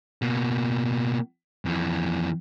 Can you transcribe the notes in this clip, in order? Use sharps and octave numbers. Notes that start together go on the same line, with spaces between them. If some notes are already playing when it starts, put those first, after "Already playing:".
B2 A#3
F2 E3